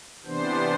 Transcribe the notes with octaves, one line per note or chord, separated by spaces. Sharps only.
C3 E3 B3 D4 C5